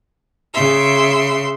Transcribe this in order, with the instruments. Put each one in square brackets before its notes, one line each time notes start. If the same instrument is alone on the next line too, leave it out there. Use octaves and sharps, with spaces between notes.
[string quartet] C#3 E5 C6